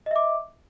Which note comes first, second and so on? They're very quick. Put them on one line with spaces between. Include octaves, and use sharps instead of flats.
D#5 E5 D6